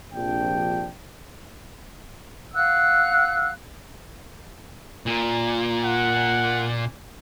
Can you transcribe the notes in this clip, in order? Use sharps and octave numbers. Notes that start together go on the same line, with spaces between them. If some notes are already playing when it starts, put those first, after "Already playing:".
A#1 C3 F3 D4 G5
F5 F#5 E6 F#6
A#2
F#5